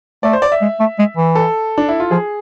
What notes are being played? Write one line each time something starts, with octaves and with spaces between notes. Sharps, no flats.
A3 D5
C5
D5
E5
G#3
A3
G#3
E3
A4
D4
E4
F4
F3 G#4